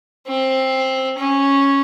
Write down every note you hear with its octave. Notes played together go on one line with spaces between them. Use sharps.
C4
C#4